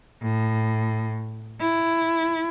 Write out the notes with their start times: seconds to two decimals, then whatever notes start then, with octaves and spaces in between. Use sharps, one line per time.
0.22 A2
1.61 E4